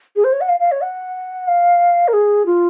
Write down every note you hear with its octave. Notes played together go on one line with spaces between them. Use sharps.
G#4
C5
C#5
F#5
F5
F5
C#5
F#5
F5
A#4
G#4
F4